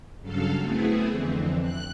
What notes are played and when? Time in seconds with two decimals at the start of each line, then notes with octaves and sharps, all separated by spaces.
0.20 G2 C#3 F#3 A4 F5
0.58 A3 B3 C4 E4 G#4
1.08 F2 D3 E3 C4
1.61 F#6